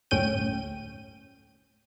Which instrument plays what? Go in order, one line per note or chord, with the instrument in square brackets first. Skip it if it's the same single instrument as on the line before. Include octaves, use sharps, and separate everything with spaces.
[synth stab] G1 D2 A2 C#4 G5 D#7